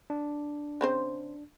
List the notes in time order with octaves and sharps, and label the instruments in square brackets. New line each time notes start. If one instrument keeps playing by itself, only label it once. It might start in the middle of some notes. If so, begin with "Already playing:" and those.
[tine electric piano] D4
[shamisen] C#3 C4 C5